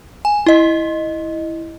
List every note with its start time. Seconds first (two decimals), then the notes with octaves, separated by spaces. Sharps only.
0.25 G#5
0.46 E4 D#5